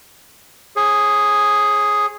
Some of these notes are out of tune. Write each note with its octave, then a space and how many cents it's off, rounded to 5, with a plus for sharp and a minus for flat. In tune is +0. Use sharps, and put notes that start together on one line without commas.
G#4 +0 C#5 -40